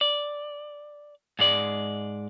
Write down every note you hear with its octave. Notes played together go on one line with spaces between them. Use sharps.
D5
G#2 G#3 D5